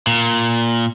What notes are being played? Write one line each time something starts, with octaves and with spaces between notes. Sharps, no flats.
A#2